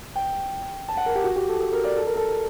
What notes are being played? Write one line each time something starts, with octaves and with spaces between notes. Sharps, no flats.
G5
A5
F#5
A#4
G4
F#4
G4
A4
A4
A#4
D5
A4
A#4
A4